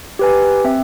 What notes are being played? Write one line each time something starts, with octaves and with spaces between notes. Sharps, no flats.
G4 B4 G#5
C4 E5